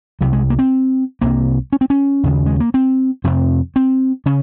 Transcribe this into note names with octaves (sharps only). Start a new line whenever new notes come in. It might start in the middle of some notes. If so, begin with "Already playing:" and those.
C2 C3 F#3
G#3
A#3
C4
C2 C3 A#3
C#4
C4
C#4
D#2 C#3
G#3
A#3
C4
F2 C3 C4
C4
C#3 C#4